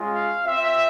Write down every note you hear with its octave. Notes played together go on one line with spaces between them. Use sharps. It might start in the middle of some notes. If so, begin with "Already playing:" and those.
Already playing: G#3 C#4 F4
F5
C4 F4 E5